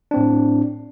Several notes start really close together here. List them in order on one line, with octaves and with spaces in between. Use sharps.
D4 C4 A2